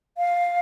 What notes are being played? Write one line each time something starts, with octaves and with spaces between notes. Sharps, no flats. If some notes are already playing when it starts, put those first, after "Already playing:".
F5